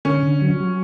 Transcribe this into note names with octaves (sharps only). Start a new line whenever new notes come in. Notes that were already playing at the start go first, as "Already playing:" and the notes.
D3 C#4
D3
F#3
F#3